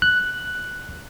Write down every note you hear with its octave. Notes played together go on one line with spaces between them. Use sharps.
F#6